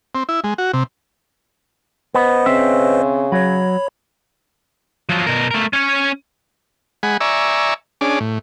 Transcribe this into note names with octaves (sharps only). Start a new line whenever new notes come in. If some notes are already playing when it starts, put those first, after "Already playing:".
C4
E4
G#3
F#4
C3
B3 B4 C5 D#5
C#3 C4 E5
F#3 C#5 B5
F3 F#3
B2 A#4
A3 A#4
C#4 C#5
G#3 F#5 G#5 B5
D5 E5 G#5 A#5 C#6 E6
C#4 D4 G#4 D6
A2